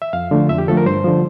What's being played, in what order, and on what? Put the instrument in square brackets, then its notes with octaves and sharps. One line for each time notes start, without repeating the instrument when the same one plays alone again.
[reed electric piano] E5
F2 F5
D3 F3 A3
F2 E5
G4
D3 F3 A3 A4
A#4
G2 C5
D3 F3